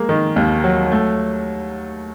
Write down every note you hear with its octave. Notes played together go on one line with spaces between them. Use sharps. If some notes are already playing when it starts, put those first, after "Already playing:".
Already playing: G#3 A#3
D#3
D#2
F#3
A3